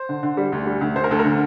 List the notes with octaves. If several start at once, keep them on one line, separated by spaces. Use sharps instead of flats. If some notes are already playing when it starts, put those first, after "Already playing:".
Already playing: C5
D3
D3
G3
D2
G3
D2
D2 C5
A#4
D2 A4
A#4
D3